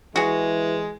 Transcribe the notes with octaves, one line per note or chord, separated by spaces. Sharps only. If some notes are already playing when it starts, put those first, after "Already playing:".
E3 G#3 F#4 G#4